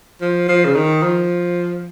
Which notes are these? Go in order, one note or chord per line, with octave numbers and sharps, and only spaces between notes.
F3
F3
C#3
D#3
F3